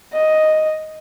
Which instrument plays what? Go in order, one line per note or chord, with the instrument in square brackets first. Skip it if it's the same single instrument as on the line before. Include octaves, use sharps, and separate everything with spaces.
[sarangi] D#5